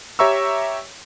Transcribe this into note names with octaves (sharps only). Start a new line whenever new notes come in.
G4 C#5 E5 A#5 C#6 E6